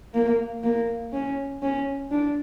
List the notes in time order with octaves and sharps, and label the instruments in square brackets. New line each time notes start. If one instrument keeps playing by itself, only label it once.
[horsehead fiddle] A#3
A#3
C#4
C#4
D4